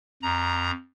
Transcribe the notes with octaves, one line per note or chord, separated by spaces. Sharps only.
F2 A#5